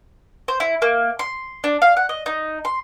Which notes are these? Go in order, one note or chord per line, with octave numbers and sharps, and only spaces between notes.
C5
E4
A#3
C6
D4
F5
F#5
D#5
D#4
C6